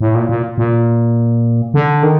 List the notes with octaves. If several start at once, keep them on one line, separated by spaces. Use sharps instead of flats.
A2
A#2
A#2
A#2
D3
D#3